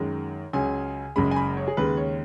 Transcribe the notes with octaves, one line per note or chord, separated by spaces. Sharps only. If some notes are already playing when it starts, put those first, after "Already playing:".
Already playing: F#2 D#3 G#3
C#2 C#3 F#3 G#5
F#1 F#2 C#3 G#3 B5
G#5
B5
C#5
G#4
D#2 C#3 G#3 B4
C#5